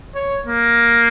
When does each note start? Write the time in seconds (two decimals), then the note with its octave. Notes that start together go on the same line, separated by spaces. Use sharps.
0.15 C#5
0.47 A#3